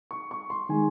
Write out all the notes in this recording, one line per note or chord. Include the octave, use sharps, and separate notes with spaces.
C#6
C#6
C6
D#3 G#3 G#5